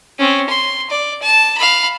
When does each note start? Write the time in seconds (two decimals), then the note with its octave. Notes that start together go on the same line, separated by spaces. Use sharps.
0.19 C4 C#4
0.49 C6
0.90 D5
1.22 A5
1.57 F5 B5